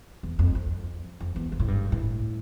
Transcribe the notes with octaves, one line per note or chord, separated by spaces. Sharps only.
E2
F2
F2
F2
E2
F2
A2
G2
A2